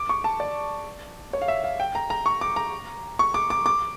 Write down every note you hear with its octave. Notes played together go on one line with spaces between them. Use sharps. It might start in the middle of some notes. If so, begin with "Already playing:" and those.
Already playing: D6
C#6
A5
D5
C#5
F5
E5
F5
G5
A#5
A#5
C#6
D6
A#5
C#6
D6
D6
D6